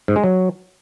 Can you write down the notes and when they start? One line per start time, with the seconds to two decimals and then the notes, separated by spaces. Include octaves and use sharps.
0.08 G#2
0.16 G#3
0.24 F#3